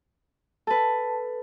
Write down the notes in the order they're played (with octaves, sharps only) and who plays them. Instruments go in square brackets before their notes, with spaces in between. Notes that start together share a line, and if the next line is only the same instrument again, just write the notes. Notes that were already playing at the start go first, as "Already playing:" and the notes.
[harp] A4 B4 [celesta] A5